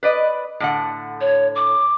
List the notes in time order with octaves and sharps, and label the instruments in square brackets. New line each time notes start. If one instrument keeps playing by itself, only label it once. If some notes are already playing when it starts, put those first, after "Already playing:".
[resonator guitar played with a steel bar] B4 D5 D#5
A2 D3 F#5
[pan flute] C#5
D6